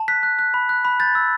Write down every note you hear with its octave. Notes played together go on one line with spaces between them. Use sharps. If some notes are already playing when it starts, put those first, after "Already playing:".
Already playing: A5
F#6 B6
F#6
F#6
B5
F#6
B5
G6 A6
E6